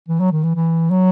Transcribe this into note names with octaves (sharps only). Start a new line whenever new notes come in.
E3
F#3
D#3
E3
E3
F#3